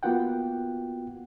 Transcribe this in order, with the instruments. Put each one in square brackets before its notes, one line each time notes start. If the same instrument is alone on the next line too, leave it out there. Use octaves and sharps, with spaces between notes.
[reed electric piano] A#3 B3 F4 F#4 F#5 G5